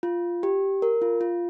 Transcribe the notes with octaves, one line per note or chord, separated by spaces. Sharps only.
F4
G4
A#4
F4
F4